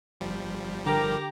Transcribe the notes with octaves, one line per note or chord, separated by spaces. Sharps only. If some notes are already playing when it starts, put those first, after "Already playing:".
G1 F3 G3
D3 G4 A#4 A#5